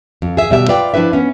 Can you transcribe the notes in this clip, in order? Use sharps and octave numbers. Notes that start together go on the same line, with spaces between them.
F2
G#4 E5
B2 G3 E5
F4 B4 D5 F5 G5
F3 D4 E4 B4 E5
B3 C#4